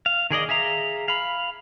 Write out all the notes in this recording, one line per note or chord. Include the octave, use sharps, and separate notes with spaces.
F5
D#3 G#4 D5 D#5
G#4 E5 F5 A#5
F5 B5